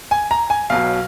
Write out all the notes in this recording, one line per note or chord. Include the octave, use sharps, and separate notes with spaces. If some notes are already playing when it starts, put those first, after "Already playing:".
G#5
A#5
G#5
B1 B2 F#3 F5